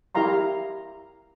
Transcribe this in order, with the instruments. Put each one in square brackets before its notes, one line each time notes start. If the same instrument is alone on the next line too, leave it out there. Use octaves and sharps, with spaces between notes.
[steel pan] E4 G4 A#4 F5 A#5 C6